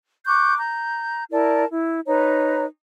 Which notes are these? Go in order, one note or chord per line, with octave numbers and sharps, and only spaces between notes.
C#6 D6 F#6 G6
A#5 G6
E4 A#4 D5 A5
E4
D#4 B4 C#5 A#5